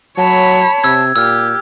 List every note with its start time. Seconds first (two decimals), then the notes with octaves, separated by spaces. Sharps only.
0.18 F#3 C#5 A5 B5
0.84 C3 E6 G#6
1.16 A#2 G4 E6 F6